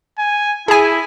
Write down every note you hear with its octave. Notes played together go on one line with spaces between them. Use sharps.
G#5
E4 G#4 G#5